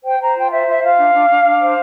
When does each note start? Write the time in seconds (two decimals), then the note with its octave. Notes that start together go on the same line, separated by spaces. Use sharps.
0.03 C5 G5
0.19 C5 A#5
0.34 F4 G5
0.50 C5 E5
0.66 F4 E5
0.82 F4 F5
0.98 D4
1.14 D4
1.29 D4
1.44 D4
1.61 C5